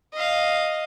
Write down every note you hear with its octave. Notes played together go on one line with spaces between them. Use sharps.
D#5 F5